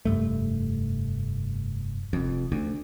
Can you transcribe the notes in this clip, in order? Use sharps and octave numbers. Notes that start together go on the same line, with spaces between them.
F1 G2 A3
F1 F2
D2